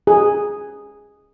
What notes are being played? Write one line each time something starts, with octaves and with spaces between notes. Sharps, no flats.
G#4